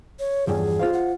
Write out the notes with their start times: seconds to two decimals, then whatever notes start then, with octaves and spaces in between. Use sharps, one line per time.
0.19 C#5
0.47 E2 G2 F3 G#4
0.79 F4 C5 F5
0.93 F#5